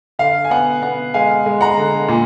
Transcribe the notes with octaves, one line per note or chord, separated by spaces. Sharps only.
D3 F5
G#5
B3 F#5
B3 F#5
G#3 F5 G#5
G#3
F#5 A#5
D3
A#2